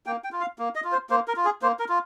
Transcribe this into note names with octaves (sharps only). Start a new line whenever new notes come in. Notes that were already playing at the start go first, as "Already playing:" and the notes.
A#3 G5
G5
F4
F5
A#3
D#5
F4
C5
A#3 C5
A#4
F4
G#4
A#3 C5
A#4
F4